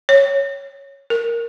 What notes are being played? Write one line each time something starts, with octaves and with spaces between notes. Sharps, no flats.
C#5
A#4